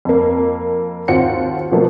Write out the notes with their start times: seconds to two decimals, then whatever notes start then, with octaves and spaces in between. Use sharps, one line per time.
0.05 F2 A#3
1.08 D#2 C4 F4 F#4 F#5 C#7
1.71 B2 F3 A3 A#3 F#4